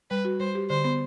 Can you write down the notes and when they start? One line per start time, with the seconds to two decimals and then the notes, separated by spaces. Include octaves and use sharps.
0.10 G3 B4
0.25 F#4
0.40 G3 C5
0.55 G4
0.69 D3 C5
0.84 B3